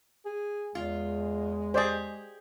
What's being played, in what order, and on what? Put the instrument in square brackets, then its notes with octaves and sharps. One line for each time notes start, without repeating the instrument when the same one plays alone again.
[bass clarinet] G#4
[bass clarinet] E2 [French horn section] G#3 [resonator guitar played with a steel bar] F4
[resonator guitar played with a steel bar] G4 G#4 [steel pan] C5 D5 D#5